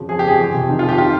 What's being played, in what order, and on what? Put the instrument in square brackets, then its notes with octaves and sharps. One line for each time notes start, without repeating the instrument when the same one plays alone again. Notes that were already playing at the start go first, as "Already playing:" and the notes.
Already playing: [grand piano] F2 C#3
F3 G#4
G4
F2 G#4
F2
C3
D#3
F4
F2
G4
D#3 F4